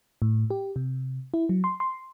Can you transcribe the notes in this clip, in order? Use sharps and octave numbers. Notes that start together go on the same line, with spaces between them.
A2
G4
C3
E4
F#3
C6
C6